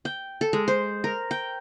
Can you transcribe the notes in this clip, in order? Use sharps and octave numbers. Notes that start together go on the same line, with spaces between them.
G5
A4
G#3
C5
A#4
G5